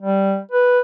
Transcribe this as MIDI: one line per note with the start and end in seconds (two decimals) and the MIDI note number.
0.02 0.39 55
0.51 0.79 71